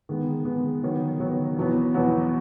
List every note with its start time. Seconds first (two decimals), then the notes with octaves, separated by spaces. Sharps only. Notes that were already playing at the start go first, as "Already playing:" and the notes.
0.09 D#3 G#3 B3
0.45 D#3 G#3 B3
0.83 D#3 F#3 B3
1.20 D#3 F#3 B3
1.57 E2 B2 F#3 B3
1.94 E2 B2 F#3 B3